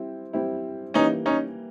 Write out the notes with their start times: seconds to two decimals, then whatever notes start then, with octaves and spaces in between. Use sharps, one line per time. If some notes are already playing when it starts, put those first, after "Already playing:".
Already playing: G3 C4 E4
0.33 G3 C4 E4
0.94 E3 G3 A#3 C#4 D#4
1.26 C#4 D#4